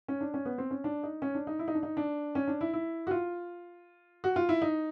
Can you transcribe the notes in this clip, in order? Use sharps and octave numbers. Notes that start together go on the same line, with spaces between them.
C#4
D4
C#4
B3
C4
C#4
D4
D#4
C#4
D4
D#4
E4
D#4
D4
D#4
D4
C#4
D4
E4
E4
F#4
F4
F#4
F4
E4
D#4